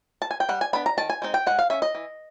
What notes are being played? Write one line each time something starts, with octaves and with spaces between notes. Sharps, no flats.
A5
G#5
G5
G3 F#5
G#5
B3 D4 B5
A#5
D#3 A5
G#5
G#3 C4 D#4
G5
G#3 F#5
F5
C#4 E5
D#5
E3